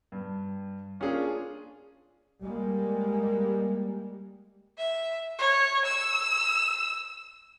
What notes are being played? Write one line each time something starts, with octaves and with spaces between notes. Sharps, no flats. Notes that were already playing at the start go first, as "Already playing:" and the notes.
G2
A#3 C#4 D4 F4 G#4
G3 G#3 A#3
E5
C#5
E6